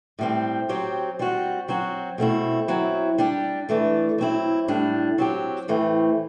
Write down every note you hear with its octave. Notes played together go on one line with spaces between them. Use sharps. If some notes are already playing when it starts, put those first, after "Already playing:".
A2 G3 C4
F#3 C4 G4
G3 C4 F#4
F#3 C4 F#4
B2 A3 C4 E4
F#3 C4 E4
G3 D4 G4
E3 A3 D4
F#3 C4 E4
A2 G3 D4
F#3 C4 G4
A2 E3 A3 C4